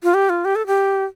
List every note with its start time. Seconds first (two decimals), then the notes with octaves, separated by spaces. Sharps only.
0.03 F4
0.14 G4
0.29 F4
0.45 G4
0.55 A4
0.67 G4